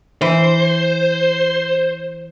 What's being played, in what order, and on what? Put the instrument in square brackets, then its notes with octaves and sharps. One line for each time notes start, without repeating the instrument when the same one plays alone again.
[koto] E3 [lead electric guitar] C5